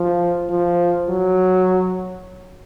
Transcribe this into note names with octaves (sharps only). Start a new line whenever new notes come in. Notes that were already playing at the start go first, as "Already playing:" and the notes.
Already playing: F3
F3
F#3